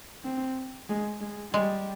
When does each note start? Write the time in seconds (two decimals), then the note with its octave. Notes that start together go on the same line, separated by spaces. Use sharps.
0.24 C4
0.89 G#3
1.21 G#3
1.54 G3 G#3